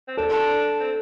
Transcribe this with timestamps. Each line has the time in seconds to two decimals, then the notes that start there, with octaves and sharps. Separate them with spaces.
0.08 C4
0.17 D4 A4
0.33 D4
0.80 C4